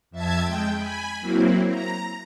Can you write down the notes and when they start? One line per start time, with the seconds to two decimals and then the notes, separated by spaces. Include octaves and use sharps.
0.11 F2 E5 A5 G#6
0.42 G#3 G5
0.75 G#5 B5
1.20 F#3 A#3 C4 E4
1.68 A#5